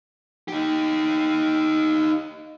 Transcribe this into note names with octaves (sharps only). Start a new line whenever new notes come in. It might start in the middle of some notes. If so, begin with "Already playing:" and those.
D#4 G4